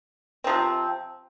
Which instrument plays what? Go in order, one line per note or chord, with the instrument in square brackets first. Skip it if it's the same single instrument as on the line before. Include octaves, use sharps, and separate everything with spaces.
[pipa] C3 F3 C4